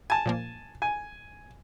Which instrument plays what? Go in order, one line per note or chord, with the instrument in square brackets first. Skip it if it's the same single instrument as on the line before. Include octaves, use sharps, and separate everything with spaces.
[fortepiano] G#5 A5 [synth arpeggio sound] G#6
[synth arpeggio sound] A#2 F3 A#3
[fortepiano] G#5